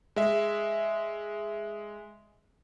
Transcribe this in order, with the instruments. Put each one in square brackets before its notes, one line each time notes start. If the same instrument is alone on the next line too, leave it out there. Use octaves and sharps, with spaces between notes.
[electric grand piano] G#3 E5